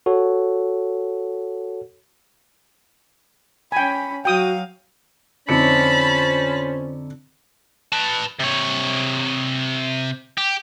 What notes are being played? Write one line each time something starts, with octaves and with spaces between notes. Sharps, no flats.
F#4 A4 C#5
C#4 G5 G#5 B5
F#3 F#4 F5 G5 D#6
F2 D3 C#4 D#4 C5 A5 B5 C#7
B4 A5
C3 C#5
G4